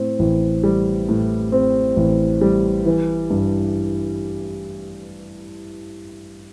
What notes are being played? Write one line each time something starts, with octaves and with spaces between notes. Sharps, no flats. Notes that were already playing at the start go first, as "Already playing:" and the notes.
Already playing: A2 C4
A1
G3
A2
C4
A1
G3
E3
G2